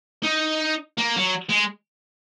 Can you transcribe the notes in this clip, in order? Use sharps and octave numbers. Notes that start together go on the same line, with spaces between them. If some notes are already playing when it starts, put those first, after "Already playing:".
D#4
A#3
F#3
G#3